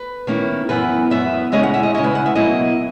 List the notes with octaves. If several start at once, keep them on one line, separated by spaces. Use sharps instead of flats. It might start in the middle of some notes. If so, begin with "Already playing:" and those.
Already playing: B4
D#3 A#3 C#4 E4
F#2 E3 B3 B4
F#2 E3 B3 E5
C#3 G#3 C#4 E4 D#5
F#5
E5
D#5
C#3 G#3 C#4 E4 D#5
B4
F#5
E5
B2 F#3 A#3 E4 D#5